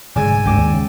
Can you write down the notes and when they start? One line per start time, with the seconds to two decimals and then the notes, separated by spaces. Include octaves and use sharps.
0.16 F1 G#2 D3 G#3 D5 G#5 E6
0.45 D2 G2 C#3 G#3 G5 D6 E6
0.58 D#2 D5
0.73 C#3